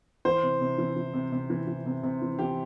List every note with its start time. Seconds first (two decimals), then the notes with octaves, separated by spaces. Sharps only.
0.25 E3 C5
0.43 C3
0.61 C3
0.78 E3
0.96 E3
1.14 C3
1.32 C3
1.50 E3
1.67 E3
1.86 C3
2.03 C3
2.22 E3
2.39 E3 G4